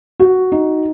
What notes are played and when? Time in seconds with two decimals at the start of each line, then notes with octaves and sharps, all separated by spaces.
0.20 F#4
0.52 D#4